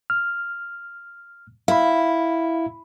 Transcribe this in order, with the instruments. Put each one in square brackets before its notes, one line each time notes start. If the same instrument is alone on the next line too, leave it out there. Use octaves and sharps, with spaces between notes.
[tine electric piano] F6
[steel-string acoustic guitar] E4 [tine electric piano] F5 B5